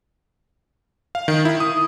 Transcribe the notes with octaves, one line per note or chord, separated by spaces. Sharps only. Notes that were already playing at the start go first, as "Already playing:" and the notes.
F5
D#3
E4
D#6